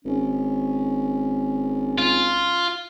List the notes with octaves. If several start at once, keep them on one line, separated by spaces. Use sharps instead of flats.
G#1 C#4
F4